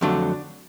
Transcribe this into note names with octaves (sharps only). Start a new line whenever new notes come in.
F2 D3 F#3 A3 D4